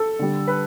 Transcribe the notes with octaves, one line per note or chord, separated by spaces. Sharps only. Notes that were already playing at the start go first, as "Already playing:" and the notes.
Already playing: A4
D3 G3
B4